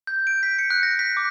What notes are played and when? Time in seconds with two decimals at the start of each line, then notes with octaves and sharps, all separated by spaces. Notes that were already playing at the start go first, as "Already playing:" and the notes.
0.07 G6
0.27 D7
0.43 B6
0.59 C#7
0.70 F#6
0.83 A#6
0.99 B6
1.17 D6